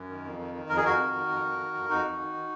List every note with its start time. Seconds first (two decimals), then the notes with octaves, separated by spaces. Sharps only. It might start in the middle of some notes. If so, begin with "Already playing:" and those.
Already playing: F#2
0.09 D#3
0.24 F2
0.39 D#3
0.54 D#3
0.69 F2 A#4
0.77 G#4
0.84 F2 F#4 A#4
1.00 D#3
1.15 D#3
1.29 F2
1.45 F2
1.59 D#3
1.75 F2
1.89 F2 D#4 F#4
2.05 F2
2.19 D#3
2.35 D#3